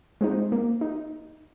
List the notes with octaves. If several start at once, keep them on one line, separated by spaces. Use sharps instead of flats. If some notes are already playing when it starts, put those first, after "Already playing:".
G#3 C4 D#4
A#3
D#4